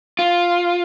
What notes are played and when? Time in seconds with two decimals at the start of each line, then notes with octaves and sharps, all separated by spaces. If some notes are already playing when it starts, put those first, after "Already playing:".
0.19 F4